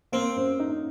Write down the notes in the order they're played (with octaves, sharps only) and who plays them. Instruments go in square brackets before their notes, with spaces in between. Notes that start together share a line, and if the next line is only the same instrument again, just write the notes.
[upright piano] A#3 [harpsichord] C4
[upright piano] F#2
D#4